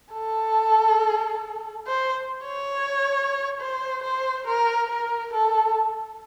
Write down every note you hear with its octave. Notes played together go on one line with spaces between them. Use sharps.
A4
C5
C#5
C5
C5
A#4
A#4
A4